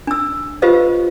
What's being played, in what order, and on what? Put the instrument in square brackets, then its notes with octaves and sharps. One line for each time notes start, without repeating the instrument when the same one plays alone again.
[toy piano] D4 E6
F4 G4 B4 C5 D#5 F5